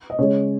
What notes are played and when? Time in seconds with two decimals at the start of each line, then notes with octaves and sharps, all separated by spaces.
0.10 D#5
0.18 C#3 G#3 C#5